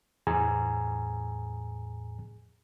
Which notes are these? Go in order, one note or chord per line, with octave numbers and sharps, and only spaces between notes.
E2 A2 G#4 G#5 A#5